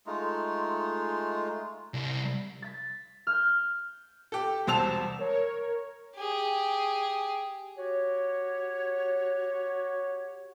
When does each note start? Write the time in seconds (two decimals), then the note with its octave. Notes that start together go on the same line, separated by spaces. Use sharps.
0.07 G#3 A3 D#4 F4
1.94 C2
2.62 A6 B6
3.27 F6 G6
4.32 G4 A4
4.67 E1 C2 C5 A5 E6 F7
5.19 A#4 C#5
6.15 G4 G#4
7.78 F#4 G4 C#5